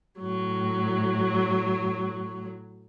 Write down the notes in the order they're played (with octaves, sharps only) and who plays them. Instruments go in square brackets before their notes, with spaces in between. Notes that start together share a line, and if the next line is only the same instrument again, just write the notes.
[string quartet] A2 F#3